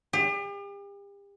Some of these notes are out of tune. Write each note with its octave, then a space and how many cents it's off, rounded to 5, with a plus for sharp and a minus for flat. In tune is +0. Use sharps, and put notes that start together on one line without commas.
G4 +40